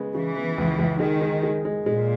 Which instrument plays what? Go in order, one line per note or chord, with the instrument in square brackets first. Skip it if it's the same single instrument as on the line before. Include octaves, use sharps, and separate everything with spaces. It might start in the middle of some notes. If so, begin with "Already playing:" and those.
Already playing: [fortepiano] C#3 G#3 B3
[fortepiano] C#3 [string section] E3
[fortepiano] B3
C#2
C#2
[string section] D#3 [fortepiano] G#3
[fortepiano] G#3
G#3
G#3
[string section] A#2 [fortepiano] G#3